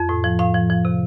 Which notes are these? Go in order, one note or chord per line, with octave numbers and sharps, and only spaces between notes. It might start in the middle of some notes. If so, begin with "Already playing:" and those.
Already playing: F2
A2
F3
A2 F5
F3
F3
C3